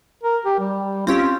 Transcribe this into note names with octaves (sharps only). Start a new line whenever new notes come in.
A#4
G4
G3
C4 C#4 F4 G4